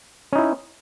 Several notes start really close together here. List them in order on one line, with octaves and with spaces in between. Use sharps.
C#4 D#4 E4